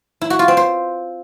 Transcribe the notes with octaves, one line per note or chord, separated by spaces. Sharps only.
E4
F#4
F4
C4
C5